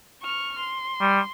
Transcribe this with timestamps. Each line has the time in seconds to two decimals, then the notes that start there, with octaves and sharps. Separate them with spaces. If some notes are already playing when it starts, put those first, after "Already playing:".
0.22 C#6 F6
0.58 C6
1.00 G3